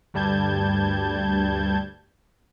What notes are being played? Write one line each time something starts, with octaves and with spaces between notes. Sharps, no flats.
D2 G2 G3 A5 G6 G#6